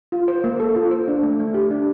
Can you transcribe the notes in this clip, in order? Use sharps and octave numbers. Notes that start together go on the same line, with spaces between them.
F4
C5
A#3
A4
F4
C5
D4
A3
A3
G4
D4